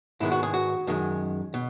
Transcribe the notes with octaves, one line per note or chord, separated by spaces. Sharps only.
G#2 D#3 G#3 B3 E4
F#4
G#4
F#4
F#2 D#3 G#3
B2